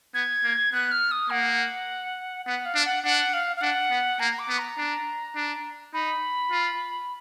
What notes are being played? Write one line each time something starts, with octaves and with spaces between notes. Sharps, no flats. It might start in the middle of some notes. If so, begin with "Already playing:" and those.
B3 G#6
A#3
B3 F#6
F6
D#6
A#3 F#5
B3 F#5
F5
D4
F#5
D4 F#5
F5
F5
D4 F#5
B3
A#3 A#5
D6
B3
A#5
D4
D4
D#4 B5
F4